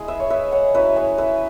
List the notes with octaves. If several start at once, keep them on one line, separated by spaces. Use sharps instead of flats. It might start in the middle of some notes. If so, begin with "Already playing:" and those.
Already playing: G#3 E4 G#4
B4 E5
C#5
B4 E5
C#5 F#5
F#3 C#4 E4 B4 E5
G#4 C#5
B4 E5